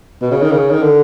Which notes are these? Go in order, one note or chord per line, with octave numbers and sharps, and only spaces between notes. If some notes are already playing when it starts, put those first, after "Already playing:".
B2
C#3
D#3
C#3
D#3
D3